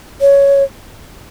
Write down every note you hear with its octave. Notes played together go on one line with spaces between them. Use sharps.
C#5